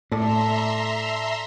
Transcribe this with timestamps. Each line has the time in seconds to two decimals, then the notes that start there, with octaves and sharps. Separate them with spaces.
0.12 A2 A4 D5 E5 A#5 C6